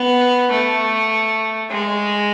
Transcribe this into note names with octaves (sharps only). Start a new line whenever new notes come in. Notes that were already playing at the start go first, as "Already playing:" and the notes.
Already playing: B3
A3
G#3